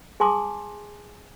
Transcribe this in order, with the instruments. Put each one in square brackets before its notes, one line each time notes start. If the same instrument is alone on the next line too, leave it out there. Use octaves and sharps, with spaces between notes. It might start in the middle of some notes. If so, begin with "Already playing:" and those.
[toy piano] G#4 G#5 A5 C6 D6 D#6